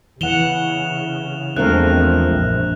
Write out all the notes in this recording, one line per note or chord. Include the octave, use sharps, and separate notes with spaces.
C#3 E3 F#5 E7 F7 G7
E2 F3 G#3 A3 C4 D4 A#4 F#6
A#1 F#2